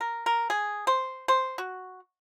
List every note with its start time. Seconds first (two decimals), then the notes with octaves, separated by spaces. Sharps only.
0.01 A#4
0.26 A#4
0.50 G#4
0.87 C5
1.28 C5
1.58 F#4